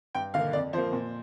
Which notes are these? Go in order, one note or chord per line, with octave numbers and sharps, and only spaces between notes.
G2 G5
D3 A#3 F5
F2 D5
F3 A#3 C5
A#2